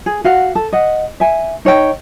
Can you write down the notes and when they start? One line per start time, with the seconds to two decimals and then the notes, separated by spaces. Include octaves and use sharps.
0.06 G#4
0.24 F#4 F5 F#5
0.55 A4
0.73 D#5 F#5
1.20 E5 G#5
1.65 D#4 C#5 E5 G5